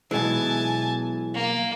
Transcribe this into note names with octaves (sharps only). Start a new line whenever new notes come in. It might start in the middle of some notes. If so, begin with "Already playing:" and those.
B1 B2 E3 G#3 E4 G#5 A5
A#3